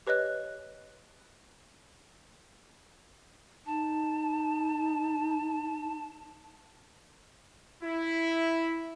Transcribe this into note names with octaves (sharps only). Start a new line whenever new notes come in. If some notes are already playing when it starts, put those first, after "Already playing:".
G4 B4 C#5 D#5 F#6
D#4 A5
E4